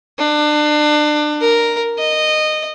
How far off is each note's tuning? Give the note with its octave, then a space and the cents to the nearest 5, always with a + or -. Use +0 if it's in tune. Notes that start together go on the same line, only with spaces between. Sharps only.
D4 +30
A#4 +0
D#5 -15